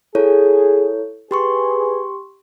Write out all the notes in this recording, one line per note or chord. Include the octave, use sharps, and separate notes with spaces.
E4 G#4 A4 C#5
G4 G#4 B4 C6 C#6